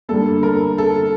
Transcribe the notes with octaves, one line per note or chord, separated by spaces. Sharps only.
D3 G3 A#3 A4
A#4
A4